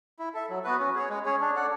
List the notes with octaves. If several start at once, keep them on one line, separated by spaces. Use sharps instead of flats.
E4
A4 E5
F#3
B3 F#4 B4
C#4
G#4 C#5
G#3
C#4 G#4 C#5
D4
A4 D5 F#5